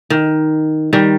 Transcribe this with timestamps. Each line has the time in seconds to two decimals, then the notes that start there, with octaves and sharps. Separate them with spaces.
0.10 D#3
0.93 D#3 G3